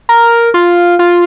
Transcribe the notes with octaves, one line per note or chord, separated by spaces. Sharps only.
A#4
F4
F4